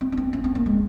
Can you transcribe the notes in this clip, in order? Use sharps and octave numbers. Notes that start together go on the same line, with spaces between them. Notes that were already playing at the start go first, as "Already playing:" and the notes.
C4
C#4
C4
C#4
C4
A#3
G#3